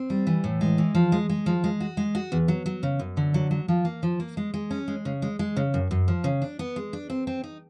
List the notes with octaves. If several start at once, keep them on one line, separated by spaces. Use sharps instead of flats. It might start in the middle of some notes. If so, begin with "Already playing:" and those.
Already playing: C4
G3
E3
A2
G#3
E3
F3
G#3
G#3
F3
G#3
F#4
G#3
F#4
E2
F#3
F#3
C#3
F#2
D3
F#3
F#3
F3
A#3
F3
A#3
G#3
G#3
C#4
G#3
C#3
G#3
G#3
C#3
F#2
F#2
F3
C#3
D4
B3
G#3
D4
C4
C4
D#4